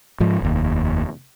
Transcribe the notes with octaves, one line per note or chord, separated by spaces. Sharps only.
G#2 F3
F1 D#2